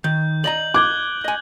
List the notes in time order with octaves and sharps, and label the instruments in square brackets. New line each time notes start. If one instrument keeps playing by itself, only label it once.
[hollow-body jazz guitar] D#3 [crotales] G6
[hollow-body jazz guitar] D5 D#5 A#5 [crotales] F#7
[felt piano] D6 [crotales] F#6 G#6 G7
[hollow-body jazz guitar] D#5 G#5